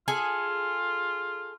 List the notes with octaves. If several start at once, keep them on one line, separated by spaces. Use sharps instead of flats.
F4 G#4 A4 G#5